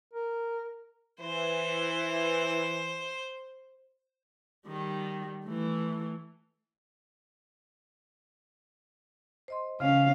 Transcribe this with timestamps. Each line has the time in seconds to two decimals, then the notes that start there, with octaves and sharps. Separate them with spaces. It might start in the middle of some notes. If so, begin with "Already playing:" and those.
0.13 A#4
1.21 E3 C5
4.67 D#3 G3
5.45 E3 A3
9.48 C5 D#5 C6
9.80 C#3 C#4 F5